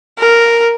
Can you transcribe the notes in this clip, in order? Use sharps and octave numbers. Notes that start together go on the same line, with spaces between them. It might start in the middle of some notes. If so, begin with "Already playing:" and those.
A#4